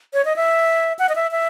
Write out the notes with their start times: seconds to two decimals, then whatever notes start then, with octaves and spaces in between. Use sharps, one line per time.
0.13 C#5
0.25 D#5
0.36 E5
0.99 F#5
1.09 D#5
1.15 E5
1.31 E5